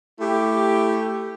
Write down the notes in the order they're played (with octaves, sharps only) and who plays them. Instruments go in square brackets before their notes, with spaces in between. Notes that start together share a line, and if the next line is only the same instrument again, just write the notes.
[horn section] A3 E4 G4